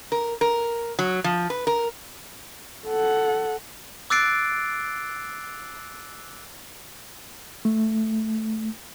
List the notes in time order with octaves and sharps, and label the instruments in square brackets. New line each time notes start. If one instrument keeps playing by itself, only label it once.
[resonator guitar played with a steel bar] A#4
A#4
F#3
F3
B4
A#4
[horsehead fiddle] A4 F#5
[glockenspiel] D6 E6 F#6 A6 C7 D7
[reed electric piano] A3